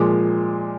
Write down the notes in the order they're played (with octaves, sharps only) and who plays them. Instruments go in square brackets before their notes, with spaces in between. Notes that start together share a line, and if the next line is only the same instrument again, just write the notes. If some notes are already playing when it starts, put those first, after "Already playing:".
Already playing: [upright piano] A#2 F3 G#3 D6